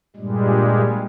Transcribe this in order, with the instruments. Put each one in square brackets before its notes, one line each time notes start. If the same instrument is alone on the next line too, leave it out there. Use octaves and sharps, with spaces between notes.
[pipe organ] G2 A#2 G3 G#3